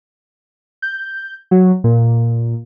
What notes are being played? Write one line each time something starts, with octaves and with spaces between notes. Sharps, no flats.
G6
F#3
A#2